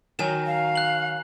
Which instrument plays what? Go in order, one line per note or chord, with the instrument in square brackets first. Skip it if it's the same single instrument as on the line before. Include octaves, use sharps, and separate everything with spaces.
[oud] D#3 F#3 [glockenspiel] G#5 E7
[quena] F5
[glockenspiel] F#6 F#7